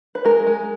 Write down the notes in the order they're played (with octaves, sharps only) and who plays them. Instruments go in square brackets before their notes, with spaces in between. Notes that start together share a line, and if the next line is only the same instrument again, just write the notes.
[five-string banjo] B4
G#3 A#4
G#3